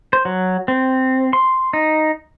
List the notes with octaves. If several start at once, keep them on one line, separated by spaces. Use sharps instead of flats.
C5
F#3
C4
C6
D#4